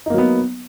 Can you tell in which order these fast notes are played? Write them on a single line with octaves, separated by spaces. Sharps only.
D#4 A#3 F#3 B3